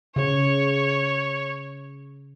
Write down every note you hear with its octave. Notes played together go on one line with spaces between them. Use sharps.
C#3 C#5